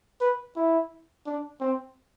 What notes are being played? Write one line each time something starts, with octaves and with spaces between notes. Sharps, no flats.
B4
E4
D4
C4